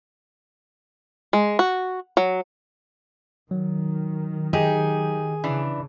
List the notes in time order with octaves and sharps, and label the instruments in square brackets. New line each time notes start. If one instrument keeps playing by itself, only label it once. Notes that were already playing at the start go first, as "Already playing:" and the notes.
[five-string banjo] G#3
F#4
F#3
[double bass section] D#3 [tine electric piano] F#3
[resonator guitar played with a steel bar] D#4 G4 [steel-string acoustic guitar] G#4
[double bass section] C#3 [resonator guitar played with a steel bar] E3 D4